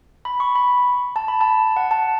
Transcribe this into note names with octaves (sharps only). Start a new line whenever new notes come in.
B5
C#6
B5
A5
B5
A5
F#5
A5